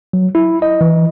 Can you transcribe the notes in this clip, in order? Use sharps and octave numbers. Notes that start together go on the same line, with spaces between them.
F#3
E4
D#5
E3